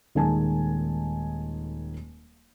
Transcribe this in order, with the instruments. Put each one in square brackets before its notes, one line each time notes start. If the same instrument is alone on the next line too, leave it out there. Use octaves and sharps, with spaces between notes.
[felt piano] D#1 D#3 G#3 G#5 A5